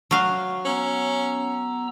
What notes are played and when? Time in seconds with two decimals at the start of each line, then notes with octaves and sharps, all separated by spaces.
0.11 F#3 F5
0.65 B3 C#4 A#5 E6